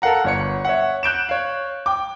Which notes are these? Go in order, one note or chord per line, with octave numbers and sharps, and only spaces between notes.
A4 A#4 F5 F#5 A#5
G1 C#5 C#7
C#5 E5 F#5
F#6 G6 D7 E7
C#5 F5
G5 D6